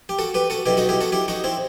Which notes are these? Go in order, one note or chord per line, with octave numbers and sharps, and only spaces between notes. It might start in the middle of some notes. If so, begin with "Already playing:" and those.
G4
F#4 A4
G4 B4
F#4 A4
B1 B2 E4 G4
D#4 F#4
E4 G4
F#4 A4
E4 G4
D#4 F#4
C4 E4